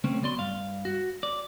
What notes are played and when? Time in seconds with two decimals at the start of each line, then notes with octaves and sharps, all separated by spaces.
0.04 C#3 A3 C4 C#4
0.21 B1 B2 D5 C6
0.39 G2 F5
0.85 F#4
1.23 D5